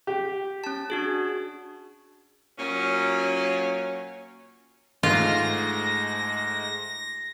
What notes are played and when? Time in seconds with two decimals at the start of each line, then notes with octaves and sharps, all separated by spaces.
0.07 G4
0.64 C#4 A5
0.90 D4 F#4 G#4
2.59 A#2 F#3 C#4
5.03 G#2 G#3 A3 F4 A#6